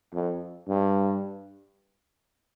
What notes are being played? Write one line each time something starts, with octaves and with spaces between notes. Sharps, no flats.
F2
G2